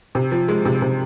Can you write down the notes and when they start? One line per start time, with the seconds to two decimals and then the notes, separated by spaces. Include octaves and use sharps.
0.15 C3
0.32 F3
0.48 G#3
0.65 C3
0.82 C3